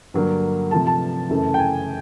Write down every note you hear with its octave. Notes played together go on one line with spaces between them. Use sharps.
G2 D3 F#3 A#3
C3 F3 A3 A5
A5
F#2 C#3 E3 A3
G5
G#5